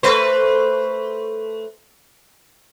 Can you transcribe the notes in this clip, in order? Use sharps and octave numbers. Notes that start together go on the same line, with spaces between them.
A3 B4 C5